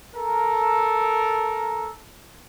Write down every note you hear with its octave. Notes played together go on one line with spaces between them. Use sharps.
A4 A#4